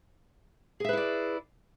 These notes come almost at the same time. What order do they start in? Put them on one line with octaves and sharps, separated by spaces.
G#4 E5 B4 E4 D5